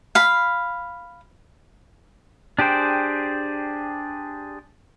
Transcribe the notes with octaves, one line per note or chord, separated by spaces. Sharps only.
F5 B5
D4 G4 G#4 C5 G5